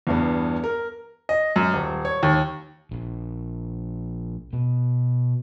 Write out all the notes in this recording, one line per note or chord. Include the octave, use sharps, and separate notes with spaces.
E2 G2 B3
A#4
D#5
F#2
D#1
C#5
D#2
A#1
B2